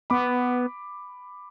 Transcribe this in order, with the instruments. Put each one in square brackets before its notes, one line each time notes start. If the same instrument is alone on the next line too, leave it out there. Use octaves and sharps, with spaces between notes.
[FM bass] B3 [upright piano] B5 D6